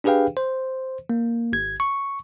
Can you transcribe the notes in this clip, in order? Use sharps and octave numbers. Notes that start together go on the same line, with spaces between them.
D4 G4 G#4 B4 F5 G5
C5
A#3
G#1 G#6
C#6